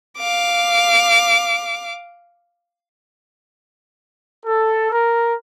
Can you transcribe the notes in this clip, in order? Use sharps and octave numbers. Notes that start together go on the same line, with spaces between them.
F5 D6
A4
A#4